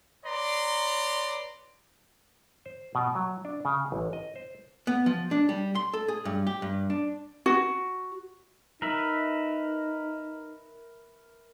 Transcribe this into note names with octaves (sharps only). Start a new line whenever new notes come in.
B4 C#5 D5 A#5 C6
C5
B2
F#3
D4
C#3
A1
D#5
C5
B3
F3
D4
G3
C6
A4
G#4
G2
G4
G2
D4
F#4
D#4 A#4 B4 E5